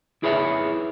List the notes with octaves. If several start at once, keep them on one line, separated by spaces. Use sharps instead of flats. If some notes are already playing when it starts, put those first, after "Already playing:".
E4 G#4 B4 C#5 E5